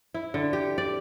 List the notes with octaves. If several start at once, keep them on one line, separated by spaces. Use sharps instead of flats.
E4
D3
G4
D5